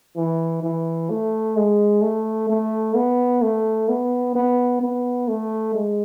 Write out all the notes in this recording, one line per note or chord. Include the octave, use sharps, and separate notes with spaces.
E3
E3
A3
G#3
A3
A3
B3
A3
B3
B3
B3
A3
G#3